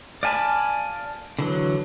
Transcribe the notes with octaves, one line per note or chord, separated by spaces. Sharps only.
D5 F5 G#5 A5 B5
D3 E3 F#3